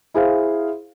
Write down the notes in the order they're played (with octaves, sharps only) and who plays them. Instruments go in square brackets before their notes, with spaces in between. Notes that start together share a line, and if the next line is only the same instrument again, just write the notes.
[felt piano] E4 G#4 C5 F5